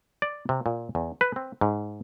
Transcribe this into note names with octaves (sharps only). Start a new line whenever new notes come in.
D5
C3
A#2
E2
B4
C4
G#2